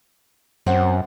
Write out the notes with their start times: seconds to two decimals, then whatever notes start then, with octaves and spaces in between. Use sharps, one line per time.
0.66 F#2 C4 F#5